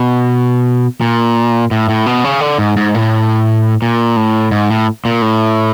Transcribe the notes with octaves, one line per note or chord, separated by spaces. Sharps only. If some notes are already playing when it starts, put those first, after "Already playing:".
Already playing: B2
A#2
A2
A2
B2
C#3
D3
G#2
G#2
A2
A#2
A2
G#2
A2
A#2
A2